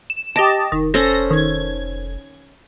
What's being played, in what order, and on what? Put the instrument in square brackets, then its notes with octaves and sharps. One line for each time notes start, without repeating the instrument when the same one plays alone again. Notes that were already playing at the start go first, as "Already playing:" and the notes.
[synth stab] E7
[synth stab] G4 D#5 A5 [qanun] D6
[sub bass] F1 [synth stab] D#3
[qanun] C#4 A4 C5 [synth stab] A#6
[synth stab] D#3 G#6